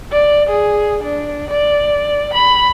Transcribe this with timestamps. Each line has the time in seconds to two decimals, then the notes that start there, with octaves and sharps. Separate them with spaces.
0.12 D5
0.49 G#4
1.03 D4
1.51 D5
2.34 B5